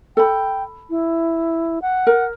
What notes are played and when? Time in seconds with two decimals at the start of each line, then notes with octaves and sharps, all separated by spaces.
0.17 A4 G5 B5
0.90 E4
1.82 F#5
2.07 A#4